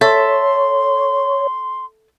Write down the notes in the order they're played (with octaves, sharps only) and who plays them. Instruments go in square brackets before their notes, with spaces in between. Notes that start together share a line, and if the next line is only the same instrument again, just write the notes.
[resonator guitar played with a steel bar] A4 E5 [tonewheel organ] C#5 [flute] C6